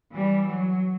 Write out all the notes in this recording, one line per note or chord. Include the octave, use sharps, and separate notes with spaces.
E3 G3
F#3